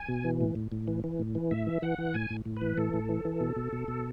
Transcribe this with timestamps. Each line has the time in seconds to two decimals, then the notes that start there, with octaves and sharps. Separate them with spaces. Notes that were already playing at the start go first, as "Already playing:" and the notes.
Already playing: G#5
0.08 B2
0.24 E3
0.41 A2
0.55 A2
0.72 A2
0.88 E3
1.04 E3
1.20 A2
1.35 E3
1.51 A2 E5
1.67 E3
1.82 E3 F#5
1.98 E3
2.14 A2 G#5
2.30 A2
2.46 A2
2.57 E3 B4
2.77 A2 A4
2.93 A2
3.09 E3
3.25 E3
3.41 B2
3.57 B2
3.73 B2
3.88 B2